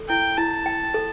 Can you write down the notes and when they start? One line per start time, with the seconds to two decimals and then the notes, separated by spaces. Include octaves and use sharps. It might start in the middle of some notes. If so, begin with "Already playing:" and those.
Already playing: A4
0.09 E4 G5
0.38 E4 A5
0.66 G5
0.94 A4